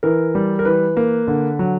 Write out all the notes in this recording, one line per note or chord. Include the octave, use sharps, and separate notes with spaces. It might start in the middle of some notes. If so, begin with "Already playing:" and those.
E3 A#4
G3
A#4
E3 B4
A#3
D3
F#3